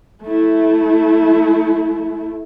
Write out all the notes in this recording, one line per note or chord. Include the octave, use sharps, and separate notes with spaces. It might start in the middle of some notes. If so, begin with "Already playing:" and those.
A3 E4